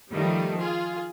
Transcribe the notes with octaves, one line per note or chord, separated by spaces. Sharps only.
D#3 F3 G3 A3
F4 G#4